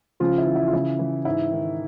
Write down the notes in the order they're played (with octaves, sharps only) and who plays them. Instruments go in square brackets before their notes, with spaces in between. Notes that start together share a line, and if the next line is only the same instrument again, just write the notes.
[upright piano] C#3 F3 F4
E4
E3
E4
F4
C#3 E4
E3
G#2 E4
D#3